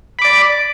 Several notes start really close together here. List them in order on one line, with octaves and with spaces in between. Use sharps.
B5 D6 D5